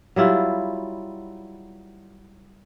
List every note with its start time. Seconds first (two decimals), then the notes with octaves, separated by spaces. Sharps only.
0.16 F#3 G3 E4 F4